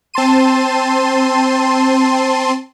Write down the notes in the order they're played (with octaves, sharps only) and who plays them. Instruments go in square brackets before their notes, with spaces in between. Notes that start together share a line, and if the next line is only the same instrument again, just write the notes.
[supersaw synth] C4 A5 C6 D#7